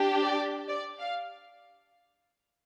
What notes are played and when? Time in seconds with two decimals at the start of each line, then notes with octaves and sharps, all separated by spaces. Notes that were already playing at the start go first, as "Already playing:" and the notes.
Already playing: D4 G4
0.21 D5
0.68 D5
0.99 F5